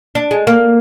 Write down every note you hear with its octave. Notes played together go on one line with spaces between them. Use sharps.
D4
G#3
A#3